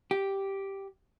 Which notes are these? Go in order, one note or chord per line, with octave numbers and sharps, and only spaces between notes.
G4